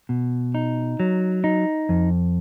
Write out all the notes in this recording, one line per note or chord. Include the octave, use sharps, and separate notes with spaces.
B2
D#4
F#3
D#4
F2